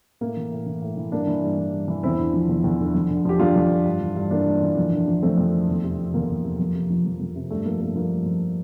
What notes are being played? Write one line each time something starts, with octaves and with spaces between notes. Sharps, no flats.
A2 A#3
E3
A2
E3
A2
E3
G2 A#3 D4
E3
G2
E3
G2
E3
E2 C4 E4
D3
F3
E2
E2
D3
F2
D3
F3 G4
F2 D4 F4
F2
D3
G2
E3
G2
E3 A#3 D4
G2
E3
F2
D3
F3
F2 A3 C4
F2
D3
E2
C3
F3
E2 A#3
E2
C3
F2
C3
F3
F2
F2
C3
G2 A3
F3 A#3
G2 A#3
F3 A#3
G2
F3